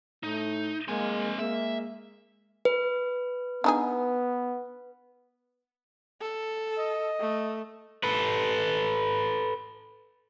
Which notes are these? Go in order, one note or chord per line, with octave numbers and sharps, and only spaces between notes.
A2 A3 D#4
G#3 A#3 C4 G#5
G#3 A#3 E5
B4
B3 D4 D#4 G#4
A4
D#5
A3
A4 B4